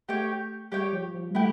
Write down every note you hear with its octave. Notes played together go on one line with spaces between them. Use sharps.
A3 G4 C#5 G5
G3 G4 C#5 G5
F3
F3
G3
A3 E4 G4